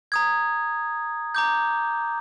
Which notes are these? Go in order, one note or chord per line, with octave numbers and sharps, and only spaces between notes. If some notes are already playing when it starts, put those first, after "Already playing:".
A#5 D#6 G#6
A#5 D6 G6